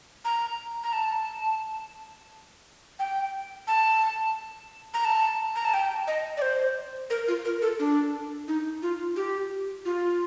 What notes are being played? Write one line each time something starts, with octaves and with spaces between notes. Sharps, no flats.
A#5
A#5
A5
G5
A5
A#5
A5
A#5
A5
G5
D#5
D5
C5
A#4
F4
A#4
A4
D4
D#4
F4
G4
F4